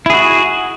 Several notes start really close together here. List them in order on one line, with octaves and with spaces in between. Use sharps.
E4 G#4 F#4